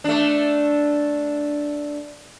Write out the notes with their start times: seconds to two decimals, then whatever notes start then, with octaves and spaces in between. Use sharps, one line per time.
0.04 A3 D4